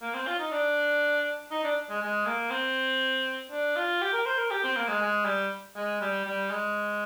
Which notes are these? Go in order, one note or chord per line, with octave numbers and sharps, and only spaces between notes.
A#3
C4
F4
D#4
D4
D#4
D4
G#3
G#3
A#3
C4
D4
F4
G4
A#4
C5
A#4
G4
C4
A#3
G#3
G#3
G3
G#3
G3
G3
G#3